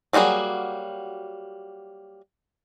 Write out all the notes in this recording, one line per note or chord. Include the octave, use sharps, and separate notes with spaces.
F#3 G3 A#3 F#4 G#4